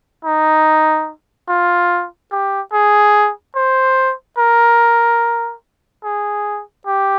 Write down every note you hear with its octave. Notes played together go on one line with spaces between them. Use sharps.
D#4
F4
G4
G#4
C5
A#4
G#4
G4